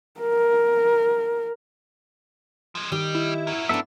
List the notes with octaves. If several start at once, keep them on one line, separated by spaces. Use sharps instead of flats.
A#4
F3 G#3
D#3 G3 G4 D#5
E4
F#4 A#4
B3 D4 E4 A4 E5